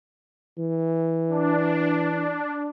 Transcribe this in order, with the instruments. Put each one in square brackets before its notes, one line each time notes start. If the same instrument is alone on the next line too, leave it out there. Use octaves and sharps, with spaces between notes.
[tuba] E3
[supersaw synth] D4